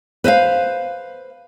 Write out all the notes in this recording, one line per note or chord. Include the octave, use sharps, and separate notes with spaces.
B4 C5 E5 F5